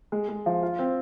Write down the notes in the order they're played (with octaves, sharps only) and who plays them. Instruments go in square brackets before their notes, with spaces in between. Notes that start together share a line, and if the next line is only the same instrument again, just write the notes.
[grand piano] G#3
G#3
F3
F4
C4